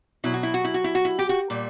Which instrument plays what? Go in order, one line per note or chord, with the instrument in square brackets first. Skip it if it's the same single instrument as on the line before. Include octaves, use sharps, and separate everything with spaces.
[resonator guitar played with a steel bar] B2 F#3 E4
F#4
E4
F#4
E4
F#4
E4
F#4
E4
G4
F#4
A#2 G3